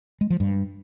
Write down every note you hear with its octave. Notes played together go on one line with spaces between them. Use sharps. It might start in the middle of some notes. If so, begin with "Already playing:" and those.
G#3
F3
G2